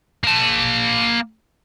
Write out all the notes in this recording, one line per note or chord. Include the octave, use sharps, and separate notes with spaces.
A#3 A5